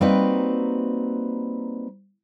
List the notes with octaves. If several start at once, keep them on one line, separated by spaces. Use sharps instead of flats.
G3 A#3 C4 D#4 F#4 B4